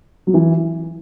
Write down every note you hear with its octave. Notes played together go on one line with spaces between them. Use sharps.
F#3
E3